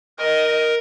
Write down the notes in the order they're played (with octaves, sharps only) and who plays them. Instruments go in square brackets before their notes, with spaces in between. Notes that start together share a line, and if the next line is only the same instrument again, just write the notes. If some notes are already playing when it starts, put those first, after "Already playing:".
[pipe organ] A#4 [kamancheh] D#5